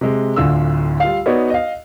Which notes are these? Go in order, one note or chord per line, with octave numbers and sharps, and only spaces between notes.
C3 G#3
D1 D2 D3 F4 E6
G3 F4 F5
B3 D#4 F#4 C#5 D5
D#5 F5